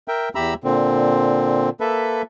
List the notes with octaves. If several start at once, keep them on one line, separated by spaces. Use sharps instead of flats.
A#4 E5 G5
E2 G4 E5 A#5 B5 E6
A#2 D3 C4
A#3 A4 B4 E5